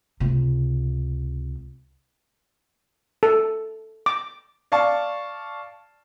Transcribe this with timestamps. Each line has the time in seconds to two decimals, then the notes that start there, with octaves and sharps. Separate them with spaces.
0.20 C#2 C3
3.23 A4
4.06 D6
4.72 D5 F5 A5 C#6